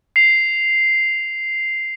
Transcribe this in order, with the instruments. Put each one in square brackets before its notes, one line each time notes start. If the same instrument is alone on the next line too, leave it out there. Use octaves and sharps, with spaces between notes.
[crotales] C7 F7